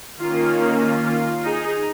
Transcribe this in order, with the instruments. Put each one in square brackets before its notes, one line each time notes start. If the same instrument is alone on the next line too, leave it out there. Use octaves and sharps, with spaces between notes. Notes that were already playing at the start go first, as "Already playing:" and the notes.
[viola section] D#3 A#3 C#4 F4
F4
D#4 G#4